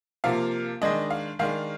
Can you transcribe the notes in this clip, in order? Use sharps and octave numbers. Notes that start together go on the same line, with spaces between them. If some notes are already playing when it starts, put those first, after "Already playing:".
C3 F3 A#3 F5
D#3 G#3 D4 D#5
F5
D#3 G#3 D4 F5